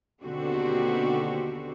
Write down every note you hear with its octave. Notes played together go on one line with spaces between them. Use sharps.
D#2 B2 D3 C4 F#4 G4